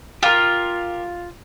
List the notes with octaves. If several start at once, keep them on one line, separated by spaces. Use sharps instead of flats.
F4 G4 A#4